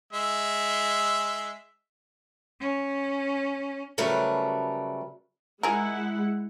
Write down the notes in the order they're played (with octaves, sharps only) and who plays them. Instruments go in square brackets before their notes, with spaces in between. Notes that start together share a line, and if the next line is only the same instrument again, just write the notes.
[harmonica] G#3 E5
[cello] C#4
[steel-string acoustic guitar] C#3 F#3 G3 A3 A#4 B4
[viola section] G#3 E4 F#5 [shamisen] G#4 A#4